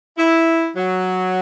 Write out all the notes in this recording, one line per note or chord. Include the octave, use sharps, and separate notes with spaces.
E4
F#3